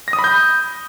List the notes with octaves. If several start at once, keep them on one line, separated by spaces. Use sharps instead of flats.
A#6
D#6
B5
G6